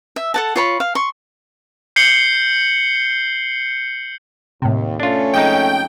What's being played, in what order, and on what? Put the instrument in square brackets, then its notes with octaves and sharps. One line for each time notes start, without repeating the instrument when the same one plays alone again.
[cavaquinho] E5
A4 F#5 A5
F4 C#5 B5
F5
C6 C#6
[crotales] G6 C7 C#7 F#7 G7
[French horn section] D#2 [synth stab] A2 C3
[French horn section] A3 C#4 [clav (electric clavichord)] D4 F4
[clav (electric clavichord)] F2 G#3 D#4 [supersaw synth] G5